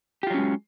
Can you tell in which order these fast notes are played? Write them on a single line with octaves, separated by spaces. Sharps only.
G4 F4 F#3 C#4 G#3